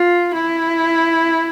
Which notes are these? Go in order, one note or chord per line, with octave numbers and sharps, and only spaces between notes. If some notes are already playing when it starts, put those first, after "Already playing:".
Already playing: F4
E4